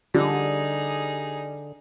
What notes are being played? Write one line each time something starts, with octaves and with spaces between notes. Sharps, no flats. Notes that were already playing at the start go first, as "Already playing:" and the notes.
D3 G3 D#4 G#4